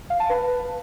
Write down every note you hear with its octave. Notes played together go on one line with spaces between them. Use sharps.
F5
A5
B4